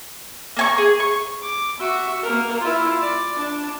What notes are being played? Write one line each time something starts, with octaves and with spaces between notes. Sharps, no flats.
A#3 G#5 C#6
G#4
C#6
D6
F#4 E5
A#3 A#4
E4 F4
D5
D4